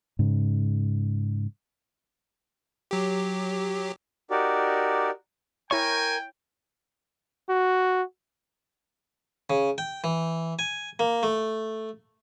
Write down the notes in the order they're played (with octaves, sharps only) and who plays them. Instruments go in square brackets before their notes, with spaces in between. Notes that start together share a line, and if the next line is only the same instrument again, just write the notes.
[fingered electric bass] G#2 C#3
[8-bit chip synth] F#3 G4
[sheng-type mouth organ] D#4 F#4 G4 A#4 D5
[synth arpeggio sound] E4 C#5 [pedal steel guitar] A#4 C#6 [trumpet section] G5 [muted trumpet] G#5
[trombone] F#4
[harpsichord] C#3
G5
E3
G#5
A#3
A3